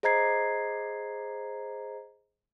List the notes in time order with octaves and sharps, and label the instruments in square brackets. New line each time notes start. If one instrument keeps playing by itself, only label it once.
[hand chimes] G#4 C5 D#5 A#5 G#6 C7